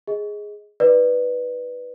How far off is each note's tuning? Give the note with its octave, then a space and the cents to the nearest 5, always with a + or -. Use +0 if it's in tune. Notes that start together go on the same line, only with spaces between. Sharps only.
G#4 +0 D#5 +20
E4 +0 B4 +0 D5 +15